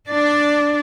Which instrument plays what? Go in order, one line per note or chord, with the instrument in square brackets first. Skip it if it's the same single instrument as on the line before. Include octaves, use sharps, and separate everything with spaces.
[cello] D4 D5